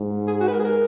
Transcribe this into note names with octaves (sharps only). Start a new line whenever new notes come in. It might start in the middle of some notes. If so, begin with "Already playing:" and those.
Already playing: G#2
G#4
F#4
B4
A#4
G#4
A#4